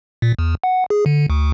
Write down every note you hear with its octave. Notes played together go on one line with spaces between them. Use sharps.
A#2
E2
F#5
G#4
D3
D2